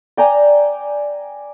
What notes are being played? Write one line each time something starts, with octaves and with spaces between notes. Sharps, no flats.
D5 G5 G#5 A#5